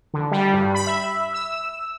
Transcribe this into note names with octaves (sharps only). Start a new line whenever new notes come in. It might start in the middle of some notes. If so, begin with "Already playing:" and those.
D3
G3
G2
B5
E5
E6